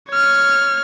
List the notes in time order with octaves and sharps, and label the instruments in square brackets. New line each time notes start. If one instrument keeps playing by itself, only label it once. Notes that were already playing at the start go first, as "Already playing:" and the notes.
[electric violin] C#5 F6